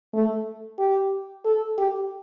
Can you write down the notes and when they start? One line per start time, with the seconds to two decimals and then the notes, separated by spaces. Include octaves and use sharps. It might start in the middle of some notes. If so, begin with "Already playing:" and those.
0.14 A3
0.79 G4
1.45 A4
1.78 G4